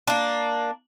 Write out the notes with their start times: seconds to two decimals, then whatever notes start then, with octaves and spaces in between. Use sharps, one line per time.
0.07 A#3 D4